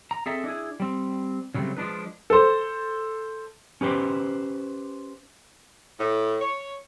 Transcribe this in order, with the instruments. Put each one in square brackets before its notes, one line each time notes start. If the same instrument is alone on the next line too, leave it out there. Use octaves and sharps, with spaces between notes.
[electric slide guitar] A#5
C4 G#4 A4 D#5 E5
D4 E4 G#4
G3 C4
C#3 F#3 G3 A3 C4
F3 G#3 D4 D#4 B4
[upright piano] A4 C5
[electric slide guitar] C#4 G4 B4 C5
[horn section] A2
C#5